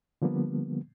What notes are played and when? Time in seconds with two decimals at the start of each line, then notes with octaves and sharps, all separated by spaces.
0.22 D3 F3 G3 A#3 B3